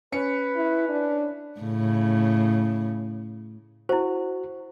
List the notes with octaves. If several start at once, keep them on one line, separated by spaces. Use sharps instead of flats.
C#4 B4 C#7
E4
D4
A2 C#3
E4 F#4 C5